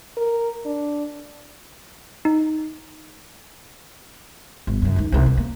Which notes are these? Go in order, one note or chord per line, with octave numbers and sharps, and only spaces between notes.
A#4
D4
D#4
G1
F#2 C#3
C#2 D#4
C2 C#4
C4
A#3